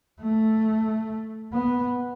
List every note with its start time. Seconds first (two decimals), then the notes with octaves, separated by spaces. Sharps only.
0.21 A3
1.53 B3